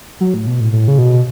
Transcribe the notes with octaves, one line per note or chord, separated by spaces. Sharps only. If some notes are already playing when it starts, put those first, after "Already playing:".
F#3
A2
B2
A2
A2
C#3
B2